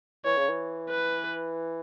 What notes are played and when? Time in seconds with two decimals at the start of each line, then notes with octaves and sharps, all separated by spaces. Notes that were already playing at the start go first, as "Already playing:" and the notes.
0.25 E3 C#5
0.37 C#3
0.49 E3
0.89 B4